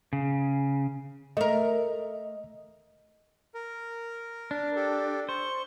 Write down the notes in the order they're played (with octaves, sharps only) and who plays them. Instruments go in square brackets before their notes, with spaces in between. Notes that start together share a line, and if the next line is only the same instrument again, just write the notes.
[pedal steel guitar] C#3
[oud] A3 A#4 [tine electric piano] D#5
[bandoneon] A#4
[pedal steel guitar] D4
[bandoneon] G4 A4
[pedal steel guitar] C5 [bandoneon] C#6